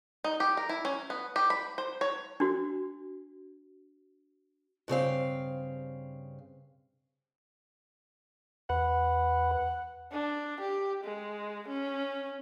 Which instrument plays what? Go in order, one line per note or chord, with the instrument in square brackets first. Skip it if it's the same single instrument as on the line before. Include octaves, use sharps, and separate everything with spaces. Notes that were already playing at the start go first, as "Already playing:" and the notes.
[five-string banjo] D#4
G4
A#4
E4
C#4
B3
G4
B5
C5
C#5
[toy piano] D4 F#4
[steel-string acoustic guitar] G2 C#3 C4 F5
[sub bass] E2 [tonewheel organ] B4 [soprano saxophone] F#5
[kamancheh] D4
G4
G#3
C#4